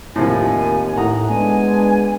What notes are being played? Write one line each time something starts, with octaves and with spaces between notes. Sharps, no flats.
D#2 A2 C3 F3 G#5
A2 F#5 A#5 D#6
G#3 B3 D4 G#5